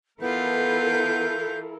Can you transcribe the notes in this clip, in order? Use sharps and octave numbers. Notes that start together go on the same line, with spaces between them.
E3 B3 E4 F4 A4 A#4 G6